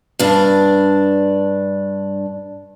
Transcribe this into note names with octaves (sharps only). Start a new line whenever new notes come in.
G2 D4